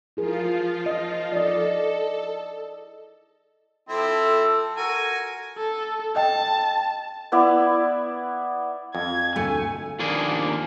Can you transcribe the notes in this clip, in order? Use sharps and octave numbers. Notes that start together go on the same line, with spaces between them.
F3 E4 F4 G#4 A#4
D#5
A4 D5 D#5
F3 C4 E4 A4
F#4 A#4 G#5
A4
D#5 G5 A5
B3 E4 D5
F2 G#6
D2 A3 G#5 C#7
D#2 F3 A#3 D4 G#4